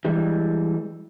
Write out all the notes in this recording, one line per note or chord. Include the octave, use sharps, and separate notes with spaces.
E3 G3 G#3